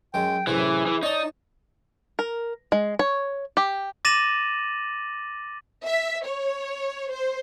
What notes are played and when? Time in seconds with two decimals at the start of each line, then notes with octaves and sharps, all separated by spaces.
0.14 F#2 G#3 G5
0.47 F#2 A2 C3 E3 G#4
0.86 E3
1.03 D#4 C#5 D5 A5
2.19 A#4
2.72 G#3
2.99 C#5
3.57 G4
4.05 D6 A6 A#6 D#7 E7 F#7
5.85 E5
6.24 C#5
7.11 C5